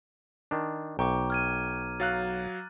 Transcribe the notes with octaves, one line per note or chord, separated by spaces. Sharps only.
D#3 D4
B1 G5 A#5 C#6 D6
F6 G#6 D#7
F#3 F5 F#6 A6